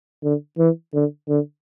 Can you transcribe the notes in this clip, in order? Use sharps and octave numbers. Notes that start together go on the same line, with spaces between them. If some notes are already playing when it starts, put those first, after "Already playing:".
D3
E3
D3
D3